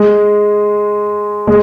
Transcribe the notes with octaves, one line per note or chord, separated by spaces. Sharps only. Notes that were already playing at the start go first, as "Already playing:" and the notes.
Already playing: G#3
G#3